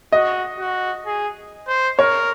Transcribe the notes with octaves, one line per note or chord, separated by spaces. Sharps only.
F#4 D#5
F#4
G#4
C5
A#4 C#5